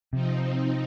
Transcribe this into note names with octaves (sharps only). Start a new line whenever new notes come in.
C3 F3 C4 D#4